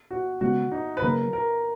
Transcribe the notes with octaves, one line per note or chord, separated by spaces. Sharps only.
F#4
C#3 G#3 B3 F#4
D#4
B4
C#3 F#3 A#3 A#4
A#4